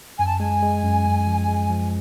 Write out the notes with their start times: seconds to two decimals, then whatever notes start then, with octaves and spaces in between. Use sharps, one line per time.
0.18 F#2 G#5
0.28 A5
0.38 G#3 G#5
0.62 G#3
0.83 F#2
1.06 F#2
1.27 F3
1.48 G#3
1.70 F3